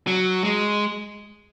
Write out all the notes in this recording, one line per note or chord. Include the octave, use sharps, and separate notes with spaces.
F#3
G#3